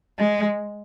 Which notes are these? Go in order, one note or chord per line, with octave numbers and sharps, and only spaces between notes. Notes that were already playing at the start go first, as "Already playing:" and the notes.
G#3